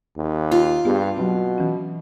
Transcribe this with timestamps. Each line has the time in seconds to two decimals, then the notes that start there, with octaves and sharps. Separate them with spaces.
0.17 D#2
0.51 F4
0.85 G2 B3 G4 G#4
1.17 B2 F#3 C4
1.58 E3 C#4